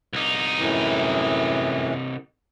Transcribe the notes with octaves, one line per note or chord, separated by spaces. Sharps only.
C2 D#4
F#2 A2 E3